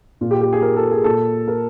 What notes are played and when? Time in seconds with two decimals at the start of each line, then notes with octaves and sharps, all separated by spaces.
0.21 A#2 F4
0.31 G4
0.41 G4
0.53 G#4
0.62 A#4
0.77 A4
0.91 G#4
1.04 A#2 A4
1.48 A#4